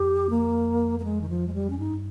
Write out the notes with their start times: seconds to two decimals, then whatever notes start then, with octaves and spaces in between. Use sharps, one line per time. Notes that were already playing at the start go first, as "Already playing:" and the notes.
Already playing: F2 G4
0.30 A#3
0.99 A#3
1.04 G#3
1.21 D#3
1.29 F3
1.48 G#3
1.54 G3
1.70 C#4
1.79 G2 D#4